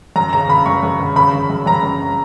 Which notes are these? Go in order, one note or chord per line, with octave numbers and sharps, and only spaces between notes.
F#2 A#5
C#3 A#5
C#3 B5
F#2 C#6
F#2
C#3
C#3 B5
C#3
F#2
F#2 A#5
F#2